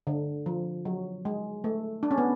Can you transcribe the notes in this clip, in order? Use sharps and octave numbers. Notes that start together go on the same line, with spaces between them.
D3
F3
F#3
G#3
A3
D4
C#4
B3